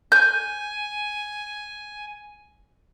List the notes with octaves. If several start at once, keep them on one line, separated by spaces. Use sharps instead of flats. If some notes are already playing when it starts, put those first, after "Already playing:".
G#5 G6